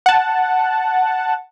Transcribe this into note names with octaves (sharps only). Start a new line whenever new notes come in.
F#5 A5